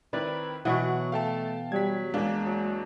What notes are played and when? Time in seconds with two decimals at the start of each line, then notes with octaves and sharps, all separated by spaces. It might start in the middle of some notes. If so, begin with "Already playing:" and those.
0.13 D#3 C4 E4 B4 D5
0.65 B2 E3 F#3 F#5 C#6
1.12 A3 F5 G5 A5
1.72 F#3 G3 G#6 B6
2.14 E2 G#3 A#3 D4
2.44 F#3